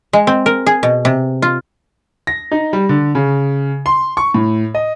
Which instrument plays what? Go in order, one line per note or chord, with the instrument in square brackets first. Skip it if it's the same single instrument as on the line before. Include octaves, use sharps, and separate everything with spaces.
[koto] G#3
C4
A#4
G#4
B2
C3
F4
[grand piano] A#6
D#4
G3
D3
C#3
C6
C#6
A2
D#5